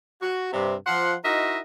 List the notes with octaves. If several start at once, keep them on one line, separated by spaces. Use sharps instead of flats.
F#4
G2 C3
F3 F#5 C6
D#4 E4 F#4 A#4 D#5 E5